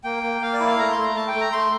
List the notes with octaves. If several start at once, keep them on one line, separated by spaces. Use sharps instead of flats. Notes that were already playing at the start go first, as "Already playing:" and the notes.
A#3 G5
A#3
A#3 F5
D5
E4
F5
A3 A#5
C6
A3
A#5
A3 A5
G5
A3
A#5
A3 C6